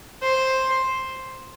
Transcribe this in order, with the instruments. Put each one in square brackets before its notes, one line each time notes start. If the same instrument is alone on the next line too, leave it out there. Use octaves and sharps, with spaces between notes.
[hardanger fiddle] C5